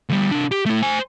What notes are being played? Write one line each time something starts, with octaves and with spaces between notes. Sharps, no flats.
D2 G3
C3 D4
G4
A3 E4
C5 G#5